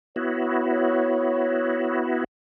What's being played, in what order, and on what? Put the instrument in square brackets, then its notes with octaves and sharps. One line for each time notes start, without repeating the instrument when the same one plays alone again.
[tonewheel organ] B3 E4 F#4 [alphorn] C#5
[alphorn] C#5